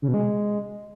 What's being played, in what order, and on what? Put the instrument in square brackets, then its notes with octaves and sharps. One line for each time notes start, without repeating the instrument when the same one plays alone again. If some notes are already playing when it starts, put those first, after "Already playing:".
[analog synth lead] C#3
B2
G#3